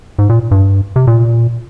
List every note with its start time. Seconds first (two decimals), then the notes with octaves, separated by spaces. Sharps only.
0.19 G#2
0.29 A#2
0.51 G2
0.96 C3
1.07 A#2